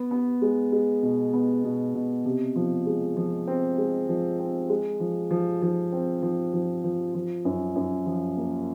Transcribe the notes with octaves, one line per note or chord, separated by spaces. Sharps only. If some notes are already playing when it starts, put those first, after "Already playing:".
Already playing: B3
B3
G#3
G#3
B2
B3
B2
B2
C3
F3
G#3
F3
C4
G#3
F3
C4
G#3
F3
F3
F3
C4
F3
F3
F3
F3
F#2
F#2
F3
A#3